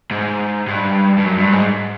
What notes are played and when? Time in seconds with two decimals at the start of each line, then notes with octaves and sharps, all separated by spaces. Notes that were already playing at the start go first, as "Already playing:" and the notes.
0.11 G#2
0.67 G2
1.17 G2
1.24 F#2
1.38 G2
1.52 G#2